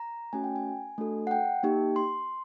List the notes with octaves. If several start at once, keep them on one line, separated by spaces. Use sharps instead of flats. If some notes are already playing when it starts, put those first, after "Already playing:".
Already playing: A#5
A3 C#4 F#4 G#5
G5
G#5
A3 D4 F#4 A4
F#5
G5
A#3 D#4 G4
C6